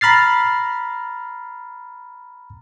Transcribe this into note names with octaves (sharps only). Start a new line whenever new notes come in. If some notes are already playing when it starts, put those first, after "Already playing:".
A#5 B5 F6 A6 C7